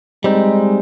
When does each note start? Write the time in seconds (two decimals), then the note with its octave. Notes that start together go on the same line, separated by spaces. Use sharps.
0.24 G3 G#3 C4 D#4